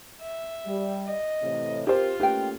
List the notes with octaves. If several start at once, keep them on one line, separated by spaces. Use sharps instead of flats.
E5
G3
D#5
A2 C3 E3
C4 F4 G4 A#4 C5
A3 A#3 C#4 G4 B4 G5